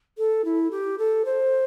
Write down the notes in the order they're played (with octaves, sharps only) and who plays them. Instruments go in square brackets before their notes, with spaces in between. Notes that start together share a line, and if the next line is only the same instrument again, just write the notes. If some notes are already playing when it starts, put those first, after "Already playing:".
[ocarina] A4
E4
G4
A4
C5